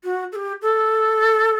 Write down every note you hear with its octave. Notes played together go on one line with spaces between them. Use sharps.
F#4
A4
G4
A4